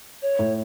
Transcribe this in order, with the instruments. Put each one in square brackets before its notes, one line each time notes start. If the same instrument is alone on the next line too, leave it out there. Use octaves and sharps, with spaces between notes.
[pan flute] C#5
[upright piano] A2